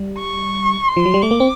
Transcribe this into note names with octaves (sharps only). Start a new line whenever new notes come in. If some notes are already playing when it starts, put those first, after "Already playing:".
Already playing: G3
C#6
C6
F3
F#3
G3
A3 D6
A#3
C4